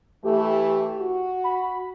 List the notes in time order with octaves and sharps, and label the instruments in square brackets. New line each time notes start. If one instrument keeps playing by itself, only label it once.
[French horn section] E3 A3 [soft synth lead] G4
[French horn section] F#4
[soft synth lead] B5